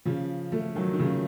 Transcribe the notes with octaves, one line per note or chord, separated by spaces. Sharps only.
C#3 F3
F3 A3
D#3 F#3
D#3
C#3 F3